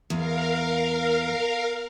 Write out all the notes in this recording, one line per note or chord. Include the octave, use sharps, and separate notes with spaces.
E2 A#4 F5